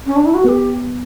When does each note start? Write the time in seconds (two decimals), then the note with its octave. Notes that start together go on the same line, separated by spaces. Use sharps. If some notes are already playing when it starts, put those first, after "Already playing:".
0.06 C#4
0.16 D4
0.26 E4
0.34 F#4
0.44 B3 B4
0.48 G4